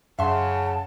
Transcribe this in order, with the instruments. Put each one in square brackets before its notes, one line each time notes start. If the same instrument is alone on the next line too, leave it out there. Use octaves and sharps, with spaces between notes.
[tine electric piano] F#2 F#5 [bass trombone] C#3 [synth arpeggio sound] E5 C6 [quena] A5